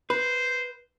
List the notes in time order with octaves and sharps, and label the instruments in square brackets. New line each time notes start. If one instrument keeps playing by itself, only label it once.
[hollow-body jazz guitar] B4 [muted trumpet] C5